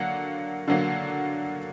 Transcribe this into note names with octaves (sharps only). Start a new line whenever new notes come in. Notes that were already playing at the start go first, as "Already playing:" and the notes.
Already playing: D3 F#3 A#3 F#5
D3 F#3 A#3